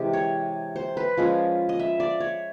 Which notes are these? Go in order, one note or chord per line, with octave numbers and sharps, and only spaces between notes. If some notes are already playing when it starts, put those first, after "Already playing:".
Already playing: C3 E3 G#3 G4
C#5
C5
B4
F3 G#3 C#4
D#5
E5
D5
C#5